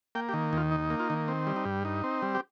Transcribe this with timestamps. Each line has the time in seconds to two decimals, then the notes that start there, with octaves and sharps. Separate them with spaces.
0.15 A#3 G5
0.29 G4
0.34 D#3
0.53 D#2 F4
0.71 D#4
0.90 A#3
1.00 F4
1.10 D#3
1.28 C4
1.47 G3
1.56 D#4
1.65 G2
1.85 D#4
2.04 C4
2.22 G3
2.35 G4